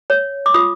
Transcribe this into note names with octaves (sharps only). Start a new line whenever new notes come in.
C#5
D6
F4 D#6